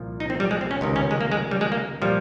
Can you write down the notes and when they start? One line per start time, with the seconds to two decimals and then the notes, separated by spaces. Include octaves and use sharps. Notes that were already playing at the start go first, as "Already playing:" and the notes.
Already playing: C2 A#2 F3
0.20 D#4
0.30 C4
0.40 G3
0.51 G#3
0.61 C4
0.71 C#4
0.81 C#2 C3 D#3
0.96 C#4
1.11 G#3
1.21 A#3
1.32 G#3
1.51 G3
1.61 G#3
1.72 A#3
2.02 A#2 F3 G3